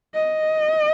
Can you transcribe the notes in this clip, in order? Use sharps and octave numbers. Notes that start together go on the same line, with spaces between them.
D#5